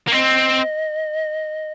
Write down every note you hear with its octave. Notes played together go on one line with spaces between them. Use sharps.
A#3
C4 D#5